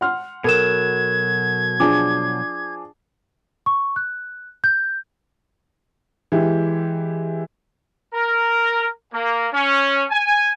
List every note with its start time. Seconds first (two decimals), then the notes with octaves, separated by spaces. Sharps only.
0.01 F#5 C6 F6
0.44 B2 F#3 A4 A#4 G#6 E7
1.80 F3 D4 G#4 D6
3.66 C#6
3.96 F#6
4.64 G6
6.32 E3 G#3 E4 G4
8.14 A#4
9.13 A#3
9.53 C#4
10.10 G#5